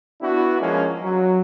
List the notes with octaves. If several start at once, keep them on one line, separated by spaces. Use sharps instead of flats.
B3 D4 E4 F#4
F3 G#3 A#3 C#4
F#3